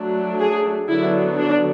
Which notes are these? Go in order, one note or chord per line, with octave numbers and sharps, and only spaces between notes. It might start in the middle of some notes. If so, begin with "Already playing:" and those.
Already playing: F#3 A3 D4
G#4
D3 F#3 B3 D4 E4
D4